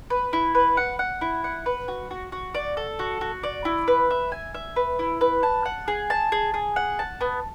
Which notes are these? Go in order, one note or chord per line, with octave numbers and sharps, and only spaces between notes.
B4
E4
B4
F#5
F#5
E4
F#5
B4
F#4
F#4
F#4
D5
A4
F#4
F#4
D5
E4
B4
E5
G#5
E5
B4
E4
B4
A5
F#5
G#4
A5
G#4
G#4
F#5
A5
B3